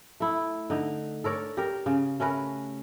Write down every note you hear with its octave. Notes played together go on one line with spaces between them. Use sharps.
A3 E4
D3 D#4
A4 A#4 C#5 D5
G4 A#4
C#3
A3 C#4 A#4 B4